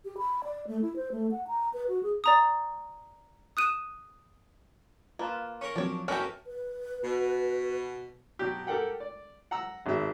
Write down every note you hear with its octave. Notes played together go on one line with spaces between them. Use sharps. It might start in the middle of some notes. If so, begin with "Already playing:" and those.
G4
B5
D5
A3
E4
C5
A3
F#5
A#5
B4
F#4
G#4
D5 A#5 D#6
D#6 F#6 D#7 E7
A#3 F4 B4 A5
C#4 A#4 C#6
F3 F#3 C4 D4 C#5
F#2 E3 A#3 C#4 G4 A4 C#6 F6
B4
B2
B2 F#3 G4
G4 A4 A#4 F#5 G5
D5
F#5 A#5 E6
G#1 B2 E5